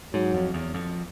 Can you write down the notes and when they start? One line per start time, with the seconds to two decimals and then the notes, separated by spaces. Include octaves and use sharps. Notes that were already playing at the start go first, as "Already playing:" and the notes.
0.13 G#2 F#3
0.34 F2
0.54 E2
0.74 F2